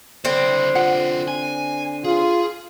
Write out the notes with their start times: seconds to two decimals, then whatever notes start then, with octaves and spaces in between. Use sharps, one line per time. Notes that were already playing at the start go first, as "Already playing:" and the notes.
0.25 D3 C4 E4 C5
0.75 F4 G4 F#5
1.28 G#5
2.05 F4 G#4